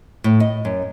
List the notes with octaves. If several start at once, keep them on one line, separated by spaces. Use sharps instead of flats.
A2
D#5
F#2